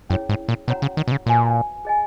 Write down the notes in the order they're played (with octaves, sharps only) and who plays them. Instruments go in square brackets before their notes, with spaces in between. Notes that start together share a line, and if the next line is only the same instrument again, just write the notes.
[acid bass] F#2 [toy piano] C#4 E4 G#4 C#5
[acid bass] G#2
A#2
[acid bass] B2 [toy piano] C#4 F#4 C#5 F#5 A#5
[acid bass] C#3
D#3
B2
C#3
[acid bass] A#2 [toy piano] F#4 B4 E5 G#5
[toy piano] G#4 D#5 G#5